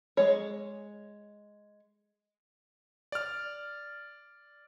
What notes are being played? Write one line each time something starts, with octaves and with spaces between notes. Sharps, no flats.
G#3 C#5
D5 F6